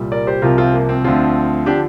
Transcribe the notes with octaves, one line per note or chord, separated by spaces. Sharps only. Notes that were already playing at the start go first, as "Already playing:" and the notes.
Already playing: C2 A#2 G3
A#4 D5
G4 C5
C2 C3 F3 F4 A#4
C4 F4
A#3
C4
D2 D3 F3 C4 F4
D3 F3 D4 G4